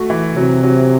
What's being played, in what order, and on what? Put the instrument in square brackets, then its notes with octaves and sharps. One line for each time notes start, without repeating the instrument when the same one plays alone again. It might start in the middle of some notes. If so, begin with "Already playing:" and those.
Already playing: [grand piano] A3 F#4
E3
[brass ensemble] C3 [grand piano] F#3
[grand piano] F#3